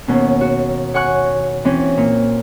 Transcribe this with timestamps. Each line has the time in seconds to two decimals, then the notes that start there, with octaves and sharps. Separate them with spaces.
0.08 D#2 B2 C#4
0.41 F#4
0.94 C#5 F#5 G#5 C#6 F#6
1.65 E3 C4 C#4
1.97 A#2